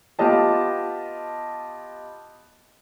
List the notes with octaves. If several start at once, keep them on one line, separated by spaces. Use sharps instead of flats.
B3 F4 G4 D#5 A5